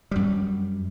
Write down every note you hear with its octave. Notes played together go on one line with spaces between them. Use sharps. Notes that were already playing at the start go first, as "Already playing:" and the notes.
F#2 G3